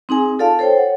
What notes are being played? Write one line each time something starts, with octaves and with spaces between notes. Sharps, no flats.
C4 D#4 G#4 G#5
F4 A4 D5 F5 A5
A4 C5 C#5 G5
C#5 F#5